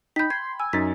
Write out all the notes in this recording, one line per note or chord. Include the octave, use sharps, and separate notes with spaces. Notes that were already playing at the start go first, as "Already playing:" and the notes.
D#4 G5 B5 G6 B6
C6 G#6
G#5 E6
F#2 D#4 A6 B6